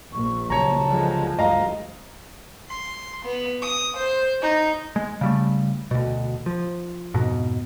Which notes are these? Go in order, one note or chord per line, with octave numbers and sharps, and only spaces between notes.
A#1 C#6
C#2 C#3 F#3 C#5 A5 A#5
D3 F3 G#3
D2 G2 G#3 D#5 F5 A#5
C6
B3
D#6
C5
D#4
G#3
C#3 G3 A3
D2 B2
F3
F2 G#2 B2